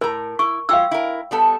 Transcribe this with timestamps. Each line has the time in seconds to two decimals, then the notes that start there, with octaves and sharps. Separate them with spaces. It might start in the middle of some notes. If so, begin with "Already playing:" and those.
0.01 A2 A#4 A#5
0.39 E4 C#6
0.69 F#3 F4 F5 G5 E6
0.91 E4 A#4
1.31 G3 B3 A4